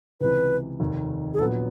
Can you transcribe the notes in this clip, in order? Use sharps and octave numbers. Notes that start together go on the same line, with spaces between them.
C#2 C3 E3 B4
F1 D#2 D#3
G#4
A#1 A#2 F#3 B3 A4